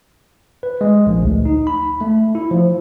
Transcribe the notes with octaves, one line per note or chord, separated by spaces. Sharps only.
B4
G#3
A#1
D2
D#4
B5
A3
E4
F3